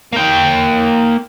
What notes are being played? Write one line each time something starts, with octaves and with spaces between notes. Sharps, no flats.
A#3 G5